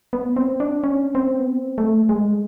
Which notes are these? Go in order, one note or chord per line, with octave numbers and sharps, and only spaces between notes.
B3
C4
D4
C#4
C4
B3
C4
A3
G#3